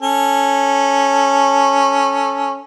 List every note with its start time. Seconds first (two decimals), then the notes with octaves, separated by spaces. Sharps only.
0.02 C#4 A4